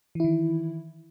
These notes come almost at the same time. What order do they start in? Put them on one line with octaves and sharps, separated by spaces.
E3 E4 D#3